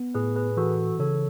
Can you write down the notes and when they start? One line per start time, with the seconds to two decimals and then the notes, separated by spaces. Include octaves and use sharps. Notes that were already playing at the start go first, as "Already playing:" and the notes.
Already playing: B3
0.14 A2 G#4 B4
0.36 G#4 B4
0.57 E3 F#4 A4
0.99 C#3 A4 C#5